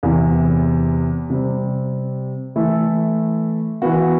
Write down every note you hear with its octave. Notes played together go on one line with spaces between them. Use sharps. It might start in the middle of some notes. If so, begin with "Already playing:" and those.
E2 C3 E3
C3 G3 C4
E3 A3 E4 A4
E3 B3 F#4